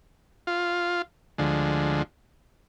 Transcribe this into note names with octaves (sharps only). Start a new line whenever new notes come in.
F4
D2 D3 F3 G#3